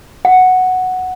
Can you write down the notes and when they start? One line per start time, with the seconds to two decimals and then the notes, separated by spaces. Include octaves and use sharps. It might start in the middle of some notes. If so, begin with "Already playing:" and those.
0.25 F#5